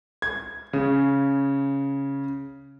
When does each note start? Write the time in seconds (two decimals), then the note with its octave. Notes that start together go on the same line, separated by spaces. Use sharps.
0.22 G#6
0.73 C#3